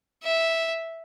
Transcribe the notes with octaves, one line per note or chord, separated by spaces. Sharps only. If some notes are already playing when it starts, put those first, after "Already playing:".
E5